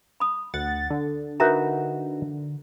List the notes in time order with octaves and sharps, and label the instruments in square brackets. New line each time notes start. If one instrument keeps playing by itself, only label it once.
[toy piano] B5 D#6
[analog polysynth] D2 F#5 A6
D3
[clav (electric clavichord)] D#4 F#4 B4 [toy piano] A#4 E5 A#5